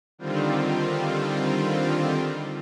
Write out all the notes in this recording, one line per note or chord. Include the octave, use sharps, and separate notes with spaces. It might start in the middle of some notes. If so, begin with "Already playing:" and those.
D3 D#3 G3 C4 F4